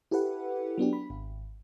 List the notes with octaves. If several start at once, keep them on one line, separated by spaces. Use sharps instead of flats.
E4 G4 A4 B4 F#5
F#3 B3 D4 G4
B5
G#1